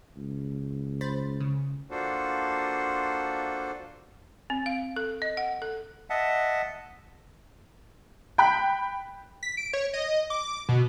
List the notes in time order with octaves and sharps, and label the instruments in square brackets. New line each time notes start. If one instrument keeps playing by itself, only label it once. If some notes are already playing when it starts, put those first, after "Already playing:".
[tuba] C#2
[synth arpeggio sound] C5 B5 A6
C#3
[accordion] A#3 D4 F4 F#4 A4 C5
[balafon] C4
F5
A4
D#5
F#5
A4
[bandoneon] D#5 E5 F#5 A5
[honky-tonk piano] G5 B5 F#6 B6
[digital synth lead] B6
D7
C#5
D#5
D6
B2